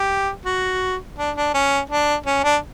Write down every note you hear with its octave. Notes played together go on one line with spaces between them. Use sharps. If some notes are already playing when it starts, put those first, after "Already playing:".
Already playing: G4
F#4
D4
D4
C#4
D4
C#4
D4